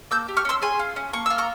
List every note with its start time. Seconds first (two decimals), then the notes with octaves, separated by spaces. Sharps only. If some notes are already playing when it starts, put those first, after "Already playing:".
0.11 A#3 E6 G6
0.28 G4
0.37 C#6 F6
0.45 C#4 C6 E6
0.62 G#4 G#5 C6
0.79 F4
0.96 C#4
1.13 A#3 C#6
1.26 F4 E6
1.38 A#5 C#6